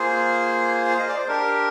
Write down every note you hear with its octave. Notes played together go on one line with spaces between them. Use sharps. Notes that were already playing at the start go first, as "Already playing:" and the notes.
Already playing: A#3 F4 G#4 C5
F5
D#5
D5
C5
D4 G4 A#4